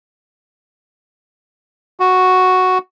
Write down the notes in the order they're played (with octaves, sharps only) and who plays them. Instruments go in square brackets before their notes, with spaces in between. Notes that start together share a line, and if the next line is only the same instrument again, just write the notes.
[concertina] F#4